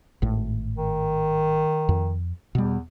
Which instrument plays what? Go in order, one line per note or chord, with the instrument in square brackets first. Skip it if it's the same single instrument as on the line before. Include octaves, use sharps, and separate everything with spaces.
[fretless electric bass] G#1 A2
[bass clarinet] D#3
[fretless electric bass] F2
[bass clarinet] E2 [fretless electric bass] B2 G3